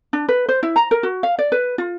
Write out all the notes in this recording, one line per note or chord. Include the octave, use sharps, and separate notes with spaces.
D4
B4
C5
E4
A#5
A#4
F#4
F5
D5
B4
F4